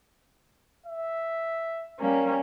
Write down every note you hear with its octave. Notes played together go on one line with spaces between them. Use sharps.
E5
G3 A#3 C#4